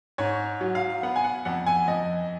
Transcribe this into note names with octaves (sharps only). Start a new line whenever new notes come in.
G#2 C#5
F#3
F5
B3 F#5
G#5
F#5
F2 F#5
G#5
F2 D#5